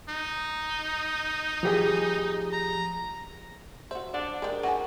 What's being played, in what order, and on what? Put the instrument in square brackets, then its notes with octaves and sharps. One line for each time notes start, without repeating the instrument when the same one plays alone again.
[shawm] D#4
[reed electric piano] F3 G4 G#4
[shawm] A#5
[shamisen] F#4 E5 [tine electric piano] C5
[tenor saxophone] D4 [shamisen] F#5
[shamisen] G#3 D#4 G4 [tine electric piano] G#4 A#4
[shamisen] D4 E4 [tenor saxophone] F#4 [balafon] F#5 G#5